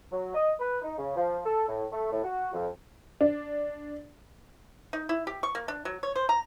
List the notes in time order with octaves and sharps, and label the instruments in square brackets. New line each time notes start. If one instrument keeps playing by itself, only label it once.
[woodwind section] F#3
D#5
B4
D#4
C#3
F3
A4
A2
A3
A2
F#4
F2
[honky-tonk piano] D4
[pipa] D#4
E4
G4
C#6
A#3
D4
F#3
C#5
C5
A#5